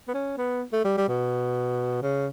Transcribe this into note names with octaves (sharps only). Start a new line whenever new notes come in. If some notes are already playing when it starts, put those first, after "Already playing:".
B3
C#4
B3
A3
G3
G3
B2
C#3